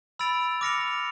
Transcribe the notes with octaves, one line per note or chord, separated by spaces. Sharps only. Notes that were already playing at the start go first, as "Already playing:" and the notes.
B5 E6 A6 D7 F7
D6 F6 A#6 C#7 F7